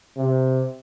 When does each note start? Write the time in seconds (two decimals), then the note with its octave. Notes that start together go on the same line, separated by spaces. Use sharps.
0.17 C3